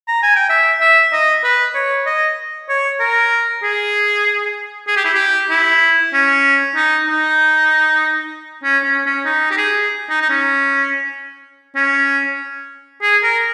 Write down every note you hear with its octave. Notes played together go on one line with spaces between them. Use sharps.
A#5
G#5
G5
E5
E5
D#5
B4
C#5
D#5
C#5
A#4
G#4
G#4
G4
E4
G4
E4
C#4
D#4
D#4
C#4
C#4
C#4
D#4
G4
G#4
D#4
D#4
C#4
C#4
G#4
A#4